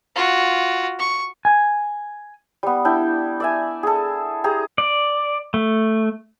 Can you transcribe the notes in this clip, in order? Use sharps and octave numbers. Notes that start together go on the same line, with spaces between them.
F4 F#4
C#6
G#5
G3 B3
D4 E4 G5
D5 E5 G#5
G#4 A4
G4 G#4 A#5
D5
A3